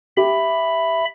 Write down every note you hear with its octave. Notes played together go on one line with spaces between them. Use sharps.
G4 E5 B5